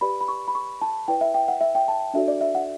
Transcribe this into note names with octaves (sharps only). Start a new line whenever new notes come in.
G4 B4 D5 B5
B5
C#6
B5
C#6
A5
E4 B4 D5 G5
E5
G5
F#5
E5
G5
A5
D4 F#4 A4 D5 E5
D5
E5
F#5